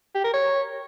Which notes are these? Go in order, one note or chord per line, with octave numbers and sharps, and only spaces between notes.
G4
A#4
C#5